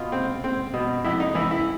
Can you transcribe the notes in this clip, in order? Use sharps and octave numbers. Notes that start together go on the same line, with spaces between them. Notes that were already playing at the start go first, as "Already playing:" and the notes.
Already playing: B2 F4
C4
C4
B2
F2 E4
D#4
E3 E4
E4